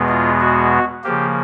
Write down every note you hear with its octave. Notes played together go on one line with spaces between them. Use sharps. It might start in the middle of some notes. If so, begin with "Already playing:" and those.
Already playing: E2 B2 G#3 B3
F4
F#4
C#3 F3 A#3 G4